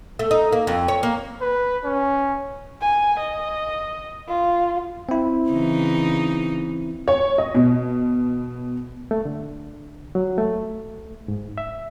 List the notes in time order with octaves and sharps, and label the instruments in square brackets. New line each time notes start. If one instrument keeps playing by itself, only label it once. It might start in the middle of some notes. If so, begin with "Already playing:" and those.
[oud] A3
D#4
A#3
F2
C#5
A#3
[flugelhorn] B4
C#4
[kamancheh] G#5
D#5
F4
[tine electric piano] C4 E4
[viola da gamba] C#3 E3 D#4
[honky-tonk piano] C#5
D#5
B2
[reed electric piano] A3
D3
F#3
A3
G#2
E5